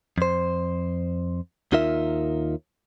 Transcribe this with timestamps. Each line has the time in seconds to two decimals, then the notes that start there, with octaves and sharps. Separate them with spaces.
0.18 F2 C5
1.72 D#2 D#4 F4 A#4 E5